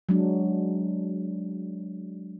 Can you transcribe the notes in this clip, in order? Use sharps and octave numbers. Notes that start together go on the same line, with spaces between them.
F#3 G#3 D4